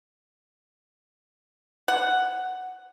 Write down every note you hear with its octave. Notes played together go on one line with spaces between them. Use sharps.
F#5